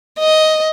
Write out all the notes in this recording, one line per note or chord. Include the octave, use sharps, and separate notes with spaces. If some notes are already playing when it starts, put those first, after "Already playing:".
D#5